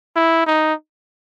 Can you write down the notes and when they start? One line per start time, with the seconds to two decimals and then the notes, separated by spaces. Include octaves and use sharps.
0.16 E4
0.46 D#4